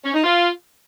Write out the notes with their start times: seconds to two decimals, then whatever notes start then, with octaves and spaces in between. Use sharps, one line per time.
0.04 C#4
0.14 D#4
0.24 F4